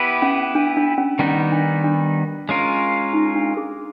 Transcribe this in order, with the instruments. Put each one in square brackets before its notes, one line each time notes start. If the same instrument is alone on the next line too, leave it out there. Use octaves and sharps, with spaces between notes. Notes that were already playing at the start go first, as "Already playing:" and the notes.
Already playing: [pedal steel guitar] B3 E4 G4 B4
[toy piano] C#4
D4
D4
C#4
[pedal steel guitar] D#3 G3 B3 D#4 [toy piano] C#4
[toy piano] D4
D4
[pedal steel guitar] G#3 C#4 F4 A#4
[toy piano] D#4
D4
G#4